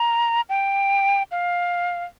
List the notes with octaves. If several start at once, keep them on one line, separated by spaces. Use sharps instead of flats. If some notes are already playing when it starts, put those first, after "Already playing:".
Already playing: A#5
G5
F5